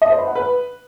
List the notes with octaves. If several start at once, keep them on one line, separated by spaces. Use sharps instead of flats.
D#5
C5
B5
F#5
B4